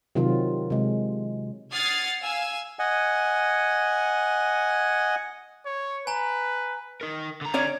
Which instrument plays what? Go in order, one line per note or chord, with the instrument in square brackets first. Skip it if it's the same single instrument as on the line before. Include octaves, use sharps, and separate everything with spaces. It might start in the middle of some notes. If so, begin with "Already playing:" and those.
[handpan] C3 D#3 F#3 F4
C3 G#3
[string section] F#5 D#6 F6 G#6 A6 C7
F5 G#5 E6
[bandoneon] D#5 F#5 G#5
[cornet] C#5
[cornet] B4 [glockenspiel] G#5 A#5
[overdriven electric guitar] D#4 A#4
D3 A#5
[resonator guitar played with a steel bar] C#4 C#5 D5